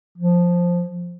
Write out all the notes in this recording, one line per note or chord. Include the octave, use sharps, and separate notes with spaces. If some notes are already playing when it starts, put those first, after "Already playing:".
F3